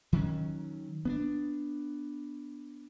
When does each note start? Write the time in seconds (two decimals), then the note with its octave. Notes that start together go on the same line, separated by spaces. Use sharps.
0.13 D#3 F#3 G3 C#4
1.05 B3 C#4 D4